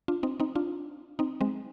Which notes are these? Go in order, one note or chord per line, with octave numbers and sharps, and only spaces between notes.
D4 F4
C4 D#4
C4 D#4
D4 F4
C4 D#4
G#3 C4